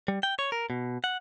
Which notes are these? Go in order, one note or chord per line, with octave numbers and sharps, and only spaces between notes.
G3
G5
C#5
A#4
B2
F#5